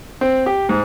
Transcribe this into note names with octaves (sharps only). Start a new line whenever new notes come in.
C4
G4
G#2